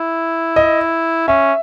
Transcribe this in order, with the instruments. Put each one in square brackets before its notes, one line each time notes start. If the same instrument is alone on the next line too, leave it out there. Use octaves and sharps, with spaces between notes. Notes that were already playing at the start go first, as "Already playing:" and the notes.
Already playing: [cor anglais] E4
[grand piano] D#5
[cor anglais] C#4 [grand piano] E5